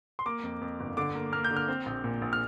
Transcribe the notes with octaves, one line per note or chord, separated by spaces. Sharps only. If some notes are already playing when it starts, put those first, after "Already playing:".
C6
A#3 D6
F2
F2
G1
D3 D6
A#3
A#3 F6
G6
D3
F6
C4
A#1
A#2
A#1
F6